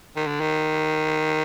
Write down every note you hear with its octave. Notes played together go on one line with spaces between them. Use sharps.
D#3
D3
D#3